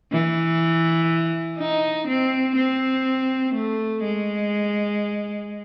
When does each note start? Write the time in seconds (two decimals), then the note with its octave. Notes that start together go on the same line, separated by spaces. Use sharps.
0.12 E3
1.59 D#4
2.08 C4
2.56 C4
3.55 A3
4.04 G#3